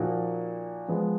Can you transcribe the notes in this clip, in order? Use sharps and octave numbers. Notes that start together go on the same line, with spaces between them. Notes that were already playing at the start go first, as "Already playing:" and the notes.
Already playing: A#2 F3 A#3 D#4 F#4
F3 G#3 B3